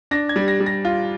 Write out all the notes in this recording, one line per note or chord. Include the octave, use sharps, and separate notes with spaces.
D4 A#6
G#6
G3
A#6
G3
A#6
F4